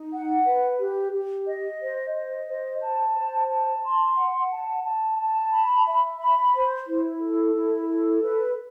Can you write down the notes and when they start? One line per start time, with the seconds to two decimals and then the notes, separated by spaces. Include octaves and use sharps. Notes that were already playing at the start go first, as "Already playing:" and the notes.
Already playing: D#4
0.12 F#5
0.46 B4
0.80 G4
1.13 G4
1.46 D#5
1.81 C5
2.14 D#5
2.48 C5
2.82 A5
3.15 C5
3.49 A5
3.84 C6
4.17 F#5
4.51 A5
4.85 A5
5.18 A5
5.53 B5
5.86 E5
6.19 B5
6.54 C5
6.88 E4
7.20 A4
7.55 E4
7.88 A4
8.22 B4